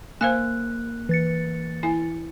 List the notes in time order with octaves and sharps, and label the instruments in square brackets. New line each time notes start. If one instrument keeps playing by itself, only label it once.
[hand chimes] A#3 F#6 [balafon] C5 F5 G#5
[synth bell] E3 A6 C#7
[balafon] E4 G#5